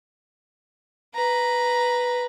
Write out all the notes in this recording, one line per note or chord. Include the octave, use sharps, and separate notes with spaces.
B4 A#5